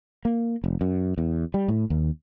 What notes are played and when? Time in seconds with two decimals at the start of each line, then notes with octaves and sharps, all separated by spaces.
0.25 A#3
0.64 F1
0.81 F#2
1.18 E2
1.54 G3
1.68 A2
1.90 D#2